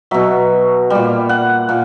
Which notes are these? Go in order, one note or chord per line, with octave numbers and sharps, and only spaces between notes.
B2 F#3 E5
A#2 G3
F#5
A#2